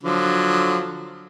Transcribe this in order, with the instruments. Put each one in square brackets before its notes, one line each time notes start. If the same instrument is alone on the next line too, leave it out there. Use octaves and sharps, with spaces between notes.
[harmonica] D3 F3 F#3